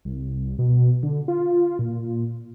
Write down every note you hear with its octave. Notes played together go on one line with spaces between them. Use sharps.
C2
B2
D3
F4
A#2